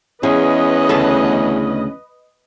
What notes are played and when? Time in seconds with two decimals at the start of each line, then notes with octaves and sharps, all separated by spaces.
0.23 E2 G#3 C#4 B4 D#5
0.89 D2 C#3 A4